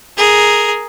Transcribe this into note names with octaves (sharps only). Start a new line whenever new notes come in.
G#4 A#4